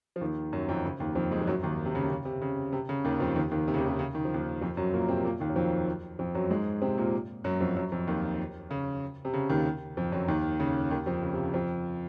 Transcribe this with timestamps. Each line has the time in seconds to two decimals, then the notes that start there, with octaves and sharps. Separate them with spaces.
0.16 F3
0.21 D#2 D#3
0.53 F#2 F#3
0.69 F2 F3
0.84 C#3
1.00 D#2 D#3
1.15 F2 F3
1.31 G#2 G#3
1.42 F3
1.47 F#2 F#3
1.63 D#2 D#3
1.86 C3
1.95 C#3
2.10 C#3
2.25 C3
2.42 C#3
2.73 C3
2.89 C#3
3.05 D#2 D#3
3.20 F2 F3
3.36 D#2 D#3
3.51 D#2 D#3
3.68 C3
3.74 C#3
3.78 D#2 D#3
3.88 C3
3.99 C#3
4.15 D#3
4.25 F3
4.34 D#2 D#3
4.61 F2 F3
4.77 F#2 F#3
4.93 A#2 A#3
5.08 C3 C4
5.24 A#2 A#3
5.40 D#2 D#3
5.49 F#3
5.56 F2 F3
6.19 F2 F3
6.35 F#2 F#3
6.50 G#2 G#3
6.81 C3 C4
6.98 A#2 A#3
7.44 F#2 F#3
7.60 F2 F3
7.76 F#2 F#3
7.92 F2 F3
8.07 D#2 D#3
8.71 C#3
9.25 C3
9.34 C#3
9.49 D#2 D#3
9.97 F2 F3
10.12 F#2 F#3
10.28 D#2 D#3
10.60 C#3
10.91 D#2 D#3
11.06 F2 F3
11.22 C#3
11.34 C3
11.43 C#3
11.54 F2 F3